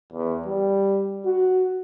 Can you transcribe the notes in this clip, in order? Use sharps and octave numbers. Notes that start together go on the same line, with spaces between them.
E2
G3
F#4